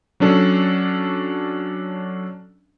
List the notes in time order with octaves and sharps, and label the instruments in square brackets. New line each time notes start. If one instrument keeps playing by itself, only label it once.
[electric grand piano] F#3 C#4 D4 A4